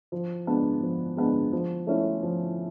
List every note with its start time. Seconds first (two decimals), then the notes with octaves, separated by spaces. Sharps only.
0.12 F3
0.47 G#3 B3 D4
0.82 F3
1.17 G#3 B3 D4
1.53 F3
1.87 A3 C#4 E4 A4
2.23 F3